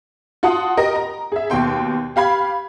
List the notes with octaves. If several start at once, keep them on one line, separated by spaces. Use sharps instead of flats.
F4 F#4 F#5 A5 C6 D#6
G4 A#4 D#5
A#5
G#4 E5
D#2 B2 G5 C6
G4 F5 B5 G#6